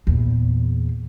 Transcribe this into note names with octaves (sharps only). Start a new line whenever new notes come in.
E2 A#2